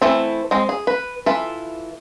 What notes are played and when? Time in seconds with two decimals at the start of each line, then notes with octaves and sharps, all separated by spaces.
0.02 E3 A3 C4 E4 A4
0.51 G#3 C4
0.69 G#4
0.87 B4
1.26 E3 F4 A4 E5